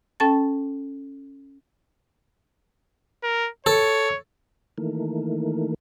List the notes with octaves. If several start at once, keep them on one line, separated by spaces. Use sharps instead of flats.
C#4 A4 G5 A5 A6
A#4
A4 C#5
D#3 E3 A3 A#3